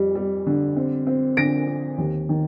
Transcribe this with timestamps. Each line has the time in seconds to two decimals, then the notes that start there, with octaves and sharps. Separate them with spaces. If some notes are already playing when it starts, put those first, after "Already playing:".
Already playing: F2 G3
0.15 G3
0.47 D3
0.76 C4
1.07 C4
1.37 D3 A#6 D7
1.67 C4
1.98 D#2
2.29 D#3